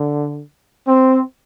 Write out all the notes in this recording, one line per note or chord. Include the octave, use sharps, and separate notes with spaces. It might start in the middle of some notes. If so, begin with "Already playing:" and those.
Already playing: D3
C4